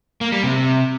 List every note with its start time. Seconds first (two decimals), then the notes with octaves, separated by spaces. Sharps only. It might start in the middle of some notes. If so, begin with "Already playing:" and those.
0.21 A#3
0.32 G3
0.43 C3